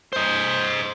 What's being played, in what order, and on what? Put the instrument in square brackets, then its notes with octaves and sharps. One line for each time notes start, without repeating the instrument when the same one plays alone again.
[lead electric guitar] C5 D#5